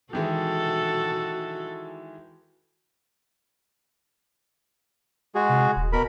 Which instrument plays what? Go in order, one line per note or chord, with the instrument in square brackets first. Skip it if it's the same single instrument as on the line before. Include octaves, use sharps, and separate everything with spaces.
[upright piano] D#3 E3 G#3 [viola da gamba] F#4 A4
[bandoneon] G#3 F#4 G#4
[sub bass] C3
D#1
[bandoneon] B2 A#4 B5